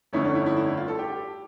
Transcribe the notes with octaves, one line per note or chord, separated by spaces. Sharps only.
G1 F2 D3 A3 C#4 E4
D4
E4
E4
E4
E4
F4
A4
G4